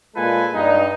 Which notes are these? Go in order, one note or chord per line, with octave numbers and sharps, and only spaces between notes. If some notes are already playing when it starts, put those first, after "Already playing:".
A#2 G#3 F4 A4 B4 G#5
G2 D#4